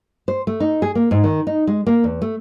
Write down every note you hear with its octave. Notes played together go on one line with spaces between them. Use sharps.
C5
A3
D#4
G#4
A#3
G#2
D#3
D#4
G#3
A#3
E2
A3